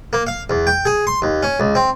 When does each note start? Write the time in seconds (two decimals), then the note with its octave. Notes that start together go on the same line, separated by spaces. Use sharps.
0.13 A#3
0.27 F5
0.50 E2
0.67 G5
0.85 G#4
1.07 C6
1.22 D#2
1.43 C#4
1.60 C#2
1.75 C4